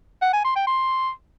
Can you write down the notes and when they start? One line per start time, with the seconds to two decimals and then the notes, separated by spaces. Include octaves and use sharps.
0.22 F#5
0.33 G#5
0.45 C6
0.56 G5
0.67 C6